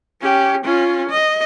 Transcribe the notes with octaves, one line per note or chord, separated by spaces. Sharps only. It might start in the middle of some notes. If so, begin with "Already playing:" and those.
C#4 G4
C#4 F4
D#5